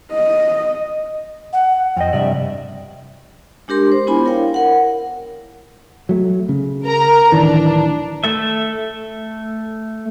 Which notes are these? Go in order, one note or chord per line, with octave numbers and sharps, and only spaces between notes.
D#5
F#5
F2 D#5 G5
G2 C3 D5 E5
G#3 D4 G4 A#4 C6
C5
B3 D4 E4 F4 G#5 B5
E4 A#4 C#5 F5 G5
A#4 F#5
F#3 A3
C#3
A#4 A#5
D1 D#3 E3 D4
A3 A4 E5